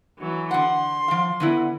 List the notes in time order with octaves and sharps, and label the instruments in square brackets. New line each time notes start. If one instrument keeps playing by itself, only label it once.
[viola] E3 F#3
[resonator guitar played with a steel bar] D3 F#5 [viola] C6
[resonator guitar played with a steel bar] F3 F5
D3 B3 E4